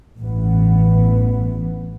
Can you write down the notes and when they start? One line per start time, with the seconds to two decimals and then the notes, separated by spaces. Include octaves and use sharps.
0.20 A1 G2 E3 B3